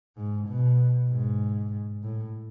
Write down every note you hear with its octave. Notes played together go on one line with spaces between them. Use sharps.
G#2
B2
G#2
A2